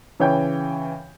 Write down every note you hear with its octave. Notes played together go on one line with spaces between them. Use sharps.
C#3 E3 C#5 G5 G6